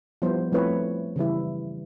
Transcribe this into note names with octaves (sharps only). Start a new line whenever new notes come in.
F3 G3 B3 E4 C5
F3 A3 C4 E4 B4 C#5
C#3 E3 G3 E4